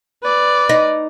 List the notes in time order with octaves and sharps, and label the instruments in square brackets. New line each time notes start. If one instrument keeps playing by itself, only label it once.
[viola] B4 D5
[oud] D#4